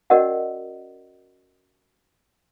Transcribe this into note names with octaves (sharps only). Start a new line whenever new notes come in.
C#4 F#4 A#4 D5 D#5 F#5